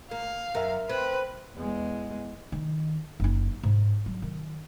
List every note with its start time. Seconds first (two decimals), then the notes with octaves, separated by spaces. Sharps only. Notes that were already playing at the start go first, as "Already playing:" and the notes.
0.11 A#3 F5
0.55 F#2 A#4 E5
0.89 C4 B4
1.55 E2 G#3
2.52 D#3
3.20 F#1 D#4
3.63 G#2
4.06 F#3
4.22 D#3